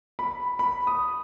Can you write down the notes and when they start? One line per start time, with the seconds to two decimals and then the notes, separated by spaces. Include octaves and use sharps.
0.19 B5
0.59 B5
0.87 D#6